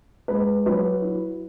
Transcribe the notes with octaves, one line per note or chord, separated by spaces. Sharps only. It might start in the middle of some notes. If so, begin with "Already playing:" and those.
G#3 B4
F#3 B4
E4